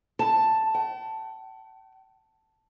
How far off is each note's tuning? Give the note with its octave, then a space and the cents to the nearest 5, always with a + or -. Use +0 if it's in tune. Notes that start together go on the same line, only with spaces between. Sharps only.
A5 +5
G5 -45